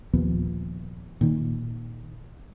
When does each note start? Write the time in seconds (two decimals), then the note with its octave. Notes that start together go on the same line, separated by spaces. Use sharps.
0.13 D#2 A#2 F3 B3
1.21 A#2 D#3